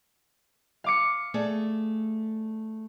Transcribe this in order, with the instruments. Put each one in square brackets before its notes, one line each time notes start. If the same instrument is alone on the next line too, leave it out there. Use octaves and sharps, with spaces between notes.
[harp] F5 D6 C#7
[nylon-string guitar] A3 G#4 D5